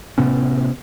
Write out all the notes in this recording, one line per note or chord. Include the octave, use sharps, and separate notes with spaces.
A2 C3 B3 C#4